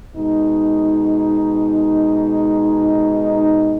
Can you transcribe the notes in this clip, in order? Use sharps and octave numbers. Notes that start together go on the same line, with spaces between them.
B2 G#3 D#4